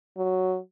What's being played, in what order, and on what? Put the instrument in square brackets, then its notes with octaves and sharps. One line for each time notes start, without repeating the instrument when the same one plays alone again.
[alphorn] F#3